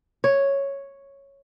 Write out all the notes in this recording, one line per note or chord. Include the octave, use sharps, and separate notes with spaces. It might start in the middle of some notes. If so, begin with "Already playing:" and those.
C#5